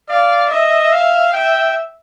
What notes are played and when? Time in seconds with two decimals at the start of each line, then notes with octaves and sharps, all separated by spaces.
0.09 D5 F5
0.50 D#5 E5
0.92 F5
1.33 E5 G5